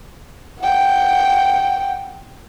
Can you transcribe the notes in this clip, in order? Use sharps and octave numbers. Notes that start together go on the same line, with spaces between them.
F#5 G5